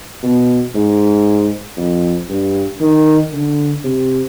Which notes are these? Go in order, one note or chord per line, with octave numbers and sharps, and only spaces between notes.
B2
G#2
F2
G2
D#3
D3
C3